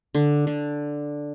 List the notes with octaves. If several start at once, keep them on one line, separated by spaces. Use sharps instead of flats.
D3
D3